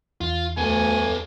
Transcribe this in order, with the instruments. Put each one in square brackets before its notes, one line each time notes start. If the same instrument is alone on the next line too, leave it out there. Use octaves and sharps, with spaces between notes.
[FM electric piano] E2 [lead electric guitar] F4
[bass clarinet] D2 [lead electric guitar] B3 A4 [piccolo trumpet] G#5